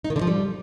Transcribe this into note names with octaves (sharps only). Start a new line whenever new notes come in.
D#4
D#3
D3
F3
G3